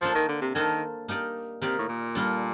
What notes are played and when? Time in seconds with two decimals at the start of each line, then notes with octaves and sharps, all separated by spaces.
0.02 F3 A#3 D4 A4 C5
0.15 D#3
0.29 D3
0.42 C3
0.55 D#3 A#3 D4 A4 C5
1.08 A#3 D#4 G4 D5
1.62 C3 A#3 D#4 G4 D5
1.79 A2
1.89 A#2
2.15 G3 A#3 D4 A4